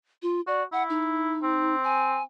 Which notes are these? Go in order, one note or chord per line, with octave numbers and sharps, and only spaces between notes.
F4
F#4 D5
E4 F#5
D#4
C4
G#5